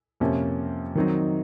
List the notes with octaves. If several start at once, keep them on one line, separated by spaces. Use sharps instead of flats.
F2 C3 F3 A#3 C#4
D#3 F#3 C4 D#4